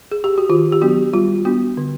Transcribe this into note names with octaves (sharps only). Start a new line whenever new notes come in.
G#4
G4
F#4
D#3 F4
G4
F#3 B3 D4 F#4
G3 F4
B3 D4 F#4
D3